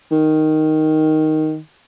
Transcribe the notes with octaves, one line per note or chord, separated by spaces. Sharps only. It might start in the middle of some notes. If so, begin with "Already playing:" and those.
D#3